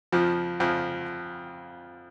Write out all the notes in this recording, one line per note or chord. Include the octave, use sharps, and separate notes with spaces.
F2 F3
F2 F3